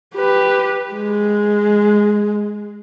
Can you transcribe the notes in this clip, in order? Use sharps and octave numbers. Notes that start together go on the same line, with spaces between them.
G4 B4
G#3